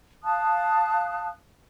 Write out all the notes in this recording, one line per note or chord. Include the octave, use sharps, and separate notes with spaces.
F5 A5 D#6 F#6